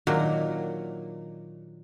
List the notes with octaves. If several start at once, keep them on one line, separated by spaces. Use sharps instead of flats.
A#2 D#3 F#3 D4